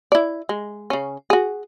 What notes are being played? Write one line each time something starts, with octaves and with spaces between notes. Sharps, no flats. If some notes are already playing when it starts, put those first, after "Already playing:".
E4 D5
G#3
C#3 C#4
F#4 G#4